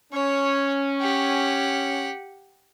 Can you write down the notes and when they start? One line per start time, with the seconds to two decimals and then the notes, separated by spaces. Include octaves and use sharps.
0.13 C#4 C#5
1.00 G4 F#5